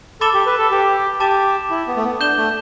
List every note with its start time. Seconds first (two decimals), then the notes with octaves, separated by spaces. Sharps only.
0.21 A4 B5 D6 A6 E7 G7
0.34 G4
0.46 B4
0.58 A4
0.71 G4
1.20 G4 A5 D6 A6 E7
1.71 E4
1.87 B3
1.97 A3
2.04 B3
2.21 D4 G6 E7 G7
2.37 A3